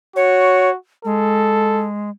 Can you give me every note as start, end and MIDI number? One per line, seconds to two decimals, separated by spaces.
0.16 0.76 66
0.16 0.70 73
1.05 2.10 56
1.05 1.87 69